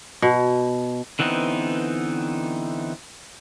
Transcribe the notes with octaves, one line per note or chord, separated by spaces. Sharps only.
B2
D3 E3 B3 C4 D#4